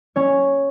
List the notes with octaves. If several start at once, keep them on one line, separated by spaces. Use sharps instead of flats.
C#4 C#5